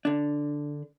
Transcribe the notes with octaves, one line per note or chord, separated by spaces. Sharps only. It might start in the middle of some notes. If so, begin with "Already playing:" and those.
D3 D4